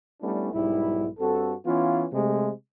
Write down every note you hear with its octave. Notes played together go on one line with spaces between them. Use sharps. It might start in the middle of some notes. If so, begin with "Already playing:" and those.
G3 A3 B3 C#4 D4 E4
B1 G#2 G3 E4
G2 C4 F#4 A4
E3 B3 C#4 F4
C3 G#3 A3